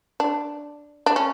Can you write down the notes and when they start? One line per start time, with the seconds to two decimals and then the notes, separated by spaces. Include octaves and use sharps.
0.20 D4
1.06 D4
1.16 C#4